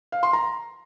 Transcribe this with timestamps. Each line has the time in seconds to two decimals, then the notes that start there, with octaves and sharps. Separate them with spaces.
0.12 F5
0.23 C6
0.33 A#5